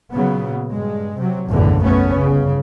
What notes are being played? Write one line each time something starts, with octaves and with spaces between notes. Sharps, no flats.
A#2 C#3 F#3 B3
G2 G#3
C3 F#3
F#1 B1 E2 A2 D3 E3
A3 B3 C#4
G1 C#3